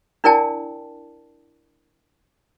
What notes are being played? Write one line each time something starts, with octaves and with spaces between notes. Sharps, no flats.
D4 E4 A#4 D5 G5 A5